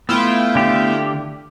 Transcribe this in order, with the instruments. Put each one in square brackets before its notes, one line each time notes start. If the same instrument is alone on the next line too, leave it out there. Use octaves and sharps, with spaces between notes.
[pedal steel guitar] A3 B3 [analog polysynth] E4 F4 G5
[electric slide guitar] D3 G4